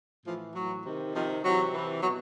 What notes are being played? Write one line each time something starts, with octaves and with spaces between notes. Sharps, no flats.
A2 E3 F3
A2 E3 F#3
C3 D#3
C3 D#3 F3
C3 E3 F#3
C3 E3
B2 F#3